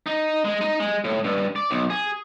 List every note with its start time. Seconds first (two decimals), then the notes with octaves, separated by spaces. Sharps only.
0.06 D#4
0.45 G#3
0.61 D#4
0.80 G#3
1.04 A2
1.24 G2
1.56 D5
1.71 B1
1.90 G#4